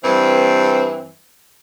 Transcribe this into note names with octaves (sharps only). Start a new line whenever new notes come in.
G2 E3 G3 C4